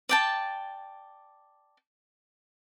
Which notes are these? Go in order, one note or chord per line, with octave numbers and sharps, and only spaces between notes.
D5 G5 A5